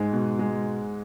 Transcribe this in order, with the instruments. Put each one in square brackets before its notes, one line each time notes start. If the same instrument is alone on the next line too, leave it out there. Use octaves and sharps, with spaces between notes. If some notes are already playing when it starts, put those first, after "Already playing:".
Already playing: [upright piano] G#2 [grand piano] G#3
[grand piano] B2
G#3